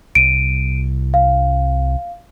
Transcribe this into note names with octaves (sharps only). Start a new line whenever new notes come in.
C2 D7 D#7
F5